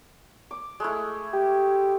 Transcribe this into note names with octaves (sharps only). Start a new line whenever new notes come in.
D6
G#3 A3 E4
G4